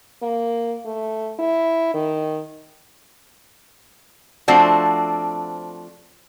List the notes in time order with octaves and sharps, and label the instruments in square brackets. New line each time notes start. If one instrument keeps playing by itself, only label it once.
[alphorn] A#3
A3
E4
D#3
[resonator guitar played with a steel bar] F3 A3 C4 D4 F#4